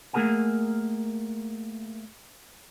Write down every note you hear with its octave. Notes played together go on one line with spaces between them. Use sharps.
A3 A#3 G#4 A#4 F#5 G#5